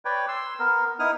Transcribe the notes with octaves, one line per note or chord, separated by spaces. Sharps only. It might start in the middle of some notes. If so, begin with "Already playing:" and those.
B4 C#5 D5 G5
C6 E6
B3 A#4
B3 D#4 E4 D#6 F6